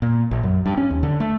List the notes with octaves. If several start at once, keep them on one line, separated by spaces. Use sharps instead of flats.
A#2
A#1
F#2
G2
C#4
D#2
D3
A3